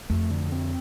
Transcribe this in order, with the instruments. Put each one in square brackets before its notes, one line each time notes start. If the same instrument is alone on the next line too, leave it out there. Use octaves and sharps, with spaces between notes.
[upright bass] F2 [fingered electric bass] A3
[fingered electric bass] D3
C4